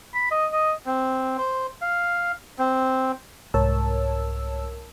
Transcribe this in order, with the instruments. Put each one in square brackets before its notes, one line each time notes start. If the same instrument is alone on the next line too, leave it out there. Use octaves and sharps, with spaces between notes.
[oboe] B5
D#5
D#5
[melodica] C4
C5
F5
C4
[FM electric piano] C2 G#2 A#4 C#5 A5 E6